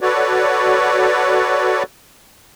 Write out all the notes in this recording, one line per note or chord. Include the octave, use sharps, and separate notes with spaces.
F#4 A4 B4 C#5 D5